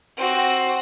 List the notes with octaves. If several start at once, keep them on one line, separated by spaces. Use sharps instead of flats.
C4 F#4